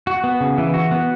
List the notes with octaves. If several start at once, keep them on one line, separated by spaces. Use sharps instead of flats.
F#4
B3
C#3
E3
F#4
B3